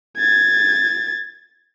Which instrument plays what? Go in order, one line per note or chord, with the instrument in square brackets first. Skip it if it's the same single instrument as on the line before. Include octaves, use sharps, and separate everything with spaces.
[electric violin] G#6 A6